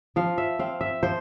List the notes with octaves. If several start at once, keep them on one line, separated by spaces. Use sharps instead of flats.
F3 F5
E5
C4 F5
E5
F3 C5